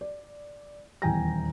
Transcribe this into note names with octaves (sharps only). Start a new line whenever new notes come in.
D5
D#1 E2 G5 G#5 A#5 A#6